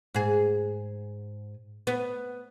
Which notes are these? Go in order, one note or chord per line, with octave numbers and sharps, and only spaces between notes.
G#2 G#4
B3